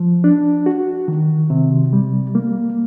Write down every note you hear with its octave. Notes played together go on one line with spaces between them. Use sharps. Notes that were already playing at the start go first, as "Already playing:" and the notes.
Already playing: F3
D4
F#4
D#3
C3
G3
A#3